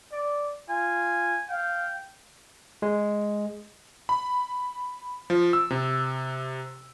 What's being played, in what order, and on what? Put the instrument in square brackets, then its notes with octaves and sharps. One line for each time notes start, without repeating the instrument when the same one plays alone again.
[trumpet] D5
[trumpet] F4 [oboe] G#5
[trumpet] F5 [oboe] G5
[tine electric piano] G#3
[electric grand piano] B5
F3
E6
C3